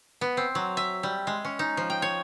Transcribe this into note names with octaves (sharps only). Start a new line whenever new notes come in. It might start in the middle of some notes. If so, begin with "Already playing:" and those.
B3
C4
F#3
E5
G3
G#3
C#4
D#4
F3
G5
C#5